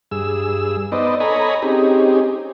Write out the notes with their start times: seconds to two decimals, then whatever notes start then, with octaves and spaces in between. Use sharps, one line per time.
0.11 G2 G#4 E6
0.92 B3 D#4 B4 C5 D5 D#5
1.20 A4 C#5 D#5 G#5 A#5 B5
1.62 C4 C#4 D#4 G4 G#4